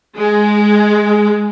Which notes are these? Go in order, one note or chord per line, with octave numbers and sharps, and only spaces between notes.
G#3